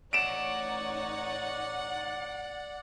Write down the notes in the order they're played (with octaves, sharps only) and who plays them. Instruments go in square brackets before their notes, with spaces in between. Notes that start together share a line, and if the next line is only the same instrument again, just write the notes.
[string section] A1 D#4 C#5 [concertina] D5 [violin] F#5 [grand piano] D7 E7